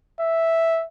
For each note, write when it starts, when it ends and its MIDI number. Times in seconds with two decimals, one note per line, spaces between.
0.20 0.85 76